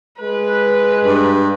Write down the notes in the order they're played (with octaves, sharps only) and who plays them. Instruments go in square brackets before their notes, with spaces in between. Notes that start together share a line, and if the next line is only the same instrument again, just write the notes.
[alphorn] G#3 [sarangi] B4
[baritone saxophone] G2